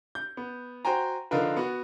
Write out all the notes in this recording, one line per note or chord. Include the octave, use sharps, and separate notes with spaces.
G6
B3
F#4 C5 G5 G#5 A#5
D3 F3 D#4 F4 A#4 B4
B3 F#4